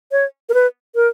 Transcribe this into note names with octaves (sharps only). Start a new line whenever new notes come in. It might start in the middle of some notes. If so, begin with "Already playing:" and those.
C#5
A#4
B4
A#4